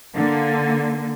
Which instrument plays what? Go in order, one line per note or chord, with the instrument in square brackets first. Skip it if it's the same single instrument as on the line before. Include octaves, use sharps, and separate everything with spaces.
[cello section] D3 A#3